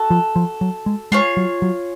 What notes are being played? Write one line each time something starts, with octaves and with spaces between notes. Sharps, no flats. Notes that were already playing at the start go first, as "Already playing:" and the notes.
Already playing: F#4 A4
F3
F3
F#3
G#3
G#3 F4 G#4 C#5
F#3
F#3